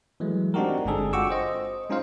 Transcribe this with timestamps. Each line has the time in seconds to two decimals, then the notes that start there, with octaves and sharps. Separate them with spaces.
0.20 E3 F#3 G#3 A3
0.54 C4 D4 D#4 F#4 G4 A#4
0.85 G1 G#3 C4 D4 G#4 A4
1.13 F4 F#4 G5 C#6 D6 E6
1.30 C5 D#5
1.90 G#3 C#4 D#4 F4 C5 F5